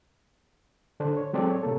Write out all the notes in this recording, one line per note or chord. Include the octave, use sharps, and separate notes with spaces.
D3 D4 A4 C5
C#5
F#3 G#3 C4 A4 D5
C#5
C3 A#3 A4